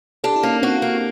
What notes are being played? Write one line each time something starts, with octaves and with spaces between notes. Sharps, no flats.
D4 G4 A4
E4
A#3 C#4 D#4
C4 D4 F#4
A#3